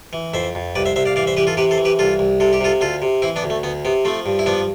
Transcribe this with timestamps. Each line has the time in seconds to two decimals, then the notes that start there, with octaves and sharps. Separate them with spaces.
0.13 E3
0.34 F2 C5 E5
0.55 F2
0.75 C2 B4 D5
0.86 C5 E5
0.96 C2 C5 E5
1.06 D5 F5
1.16 E3 D5 F5
1.27 C5 E5
1.37 E3 G4 B4
1.47 F4 A4
1.57 C3 G4 B4
1.71 A4 C5
1.78 E3
1.85 G4 B4
1.99 C2 F4 A4
2.19 C2
2.40 C3 A4
2.53 G4
2.61 C3 F4 A4
2.81 D2 F4 A4
3.02 C3
3.22 E3 C4 E4
3.36 B3 D4
3.43 D2
3.50 A3
3.63 D2 B3
3.85 C3 B3
4.05 F3 A3 C4
4.26 G2
4.39 E4
4.46 F3 B3 D4